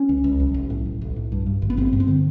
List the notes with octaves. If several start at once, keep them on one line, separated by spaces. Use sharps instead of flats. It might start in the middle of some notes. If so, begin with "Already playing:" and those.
Already playing: C#4
C#2
C#2
B1
B1
A2
B1
B1
A2
G2
G2
G#1
B3
G#1 C4
G2
C4
D3